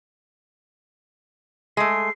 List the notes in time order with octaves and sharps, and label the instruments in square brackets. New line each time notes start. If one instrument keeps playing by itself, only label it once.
[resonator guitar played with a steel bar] G#3 A3 [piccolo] C7